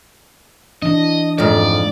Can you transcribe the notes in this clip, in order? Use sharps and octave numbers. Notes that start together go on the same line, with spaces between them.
E3 D4 D#5
F2 G#2 D5